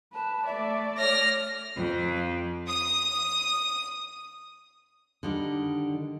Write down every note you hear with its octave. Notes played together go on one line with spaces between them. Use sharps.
B4 A5
A3 D5 E5
C#5 F6 A#6
F2
D#6
D3 D#3 G3